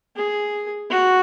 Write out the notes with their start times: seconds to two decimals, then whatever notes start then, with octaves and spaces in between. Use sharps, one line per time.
0.16 G#4
0.90 F#4